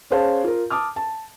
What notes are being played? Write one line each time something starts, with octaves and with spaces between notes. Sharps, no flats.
C#4 G#4 C5 F5 A5
F4 A#4
A5 D6 D#6 F6
A5